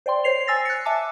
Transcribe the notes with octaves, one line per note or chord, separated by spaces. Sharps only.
C5 D5 G5 C6
C5 C#5 C7 F7
G#5 E6 A6 A#6
F#6 C#7
E5 G#5 A5 D6 E6